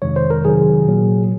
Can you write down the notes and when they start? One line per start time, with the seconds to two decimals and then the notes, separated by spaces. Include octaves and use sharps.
0.02 F2 C3 D#3 G#3 C#5
0.16 C5
0.30 A#4
0.45 C3 D#3 F#3 G#4
0.87 A#2 F#3 A#3